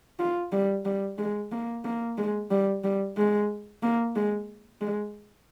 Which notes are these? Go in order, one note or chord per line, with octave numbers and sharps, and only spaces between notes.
F4
G3
G3
G#3
A#3
A#3
G#3
G3
G3
G#3
A#3
G#3
G#3